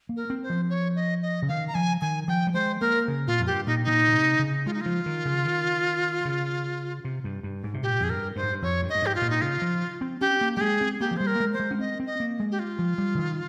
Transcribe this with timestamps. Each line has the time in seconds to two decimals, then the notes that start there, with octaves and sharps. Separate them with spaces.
0.09 A#3
0.16 A#4
0.30 C4
0.43 C5
0.50 F3
0.70 C#5
0.96 D#5
1.22 D#5
1.42 C#3
1.49 D#3 F5
1.68 A#5
1.75 F3 G#5
2.01 D#3 G#5
2.28 F3 G5
2.47 G3
2.54 G#3 C5
2.81 A#3 A#4
3.08 C#3
3.27 A#2 F4
3.39 F2
3.47 G2 G4
3.67 A#2 D#4
3.84 A#2 D#4
4.08 C#3
4.13 C3
4.39 C#3
4.66 G#3 F4
4.74 D#4
4.81 F3 F4
5.06 D#3
5.25 C#3
5.45 D#3
6.25 C#3
7.04 C3
7.24 G2
7.43 G2
7.63 G#2
7.74 C3
7.83 A#2 G4
8.00 F2 G#4
8.10 G2 A#4
8.36 G2 C5
8.43 G#2
8.51 G2
8.62 F2 C#5
8.82 G2
8.89 D#5
8.95 G2
9.02 G#2 G4
9.15 F4
9.22 A#2
9.30 D#4
9.41 C#3 F4
9.62 F3
10.01 C4
10.21 C#4 G4
10.41 A#3
10.55 G3 G4
10.61 G#3 G#4
10.81 C4
11.00 A#3 G4
11.11 F3
11.17 G3 C5
11.27 A#4
11.35 A#3
11.40 G#3
11.53 C5
11.60 G#3
11.71 C#4
11.79 C4 D#5
12.00 C4
12.06 D#5
12.20 A#3
12.40 G#3
12.51 G4
12.59 F4
12.79 F3
12.98 G3
13.15 C#3
13.18 D#3